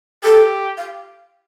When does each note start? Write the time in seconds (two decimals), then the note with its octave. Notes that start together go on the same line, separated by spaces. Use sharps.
0.23 G4 A4
0.77 F5